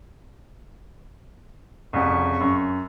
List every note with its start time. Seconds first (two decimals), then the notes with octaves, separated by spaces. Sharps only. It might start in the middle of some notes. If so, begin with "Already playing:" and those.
1.93 C2 F2 C#3 C#6
2.40 F#2